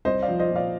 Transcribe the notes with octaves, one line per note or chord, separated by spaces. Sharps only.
C2 C5 D#5
D5 F5
F3
C5 D#5
A#2
D5 F5